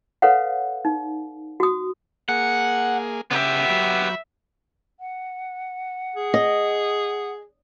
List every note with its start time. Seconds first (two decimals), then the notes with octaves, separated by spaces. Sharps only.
0.22 A4 B4 C#5 F5 F#5
0.85 D#4
1.60 F#4 D#6
2.29 A#3 G#4 F#5
3.31 C#3 B3 G4 E5
3.69 F#3 B5
5.00 F#5
6.16 G#4
6.34 D#5